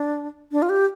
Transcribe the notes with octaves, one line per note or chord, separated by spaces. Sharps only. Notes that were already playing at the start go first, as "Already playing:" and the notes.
Already playing: D4
D4
F4
G4